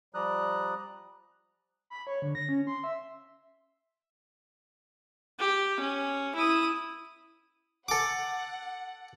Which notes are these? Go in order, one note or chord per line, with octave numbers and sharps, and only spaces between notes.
F3 G3 D5 A#5 D#6 F#6
B5
C#5
D3
A#6
C#4
C6
E5
G4
C#4
E4 D#6
A4 F#5 D6